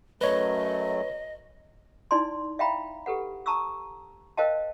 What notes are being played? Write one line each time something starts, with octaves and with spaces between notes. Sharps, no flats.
F#2 F#3 A3 B4 C#5 D#5
D#4 E4 D5 G#5 C6
E5 F5 G5 A#5 B5
G4 A4 B4 F#5
A5 A#5 C#6 D#6 E6
A#4 C5 D#5 F5 G5 A5